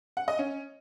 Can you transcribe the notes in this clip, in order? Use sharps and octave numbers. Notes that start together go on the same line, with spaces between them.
F#5
D#5
C#4